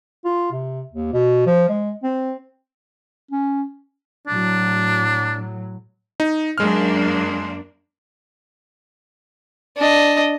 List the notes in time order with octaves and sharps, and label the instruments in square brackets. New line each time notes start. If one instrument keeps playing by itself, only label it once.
[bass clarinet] F4
C3
D#2
B2
F3
G#3
C4
[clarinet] C#4
[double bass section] A2 F#3 [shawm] D4
[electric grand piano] D#4
[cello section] F#2 A#3 D4 [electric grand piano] G#3 F6
[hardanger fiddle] D4 D#5